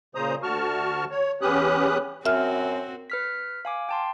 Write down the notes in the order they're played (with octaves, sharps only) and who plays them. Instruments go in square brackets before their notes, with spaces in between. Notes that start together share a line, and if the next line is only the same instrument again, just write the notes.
[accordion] A#2 C#3 C5 A#5 D#6
D2 D3 F#4 A5 C#6 F6
C#5
E2 C#4 G4 B4 D#6 F#6
[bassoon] F#2 [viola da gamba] C4 F#4 [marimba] E5 F6
[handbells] B4 F6 B6
F5 G#5 D6
G5 A5 C6